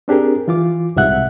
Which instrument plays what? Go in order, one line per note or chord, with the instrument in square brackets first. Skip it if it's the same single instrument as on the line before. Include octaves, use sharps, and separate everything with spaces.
[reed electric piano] C4 D4 G4 G#4 A#4
E3 F4 D6
C2 G#2 C3 E5 F#5 F#6